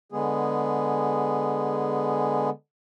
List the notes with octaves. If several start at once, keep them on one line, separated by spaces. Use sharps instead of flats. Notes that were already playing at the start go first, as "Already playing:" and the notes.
D3 G#3 B3 G#4